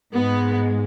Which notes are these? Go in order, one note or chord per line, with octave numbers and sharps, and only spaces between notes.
G#2 G#3 B3